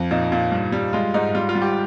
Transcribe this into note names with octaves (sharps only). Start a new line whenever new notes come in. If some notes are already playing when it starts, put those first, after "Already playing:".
Already playing: F2
A#2 D#4
A#2
G2
G3
G#3 F4
G#2 D#4
G3 F4
F4
G3
G4